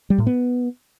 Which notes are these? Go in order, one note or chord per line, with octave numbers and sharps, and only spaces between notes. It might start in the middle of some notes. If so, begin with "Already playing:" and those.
G3
A2
B3